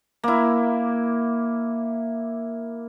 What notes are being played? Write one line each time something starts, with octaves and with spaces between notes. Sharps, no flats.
A#3 E4